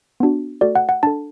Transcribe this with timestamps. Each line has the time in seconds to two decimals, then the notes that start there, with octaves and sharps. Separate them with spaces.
0.20 B3 D4 F#4
0.61 A3 F#4 A4 D5
0.75 F#5
0.89 F#5
1.03 D4 A4 A5